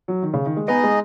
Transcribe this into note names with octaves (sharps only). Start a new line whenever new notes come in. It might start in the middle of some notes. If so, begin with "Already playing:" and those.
F#3
D#3
C#3
D#3
G#3
B3 D#4 G#4 D#5
G#3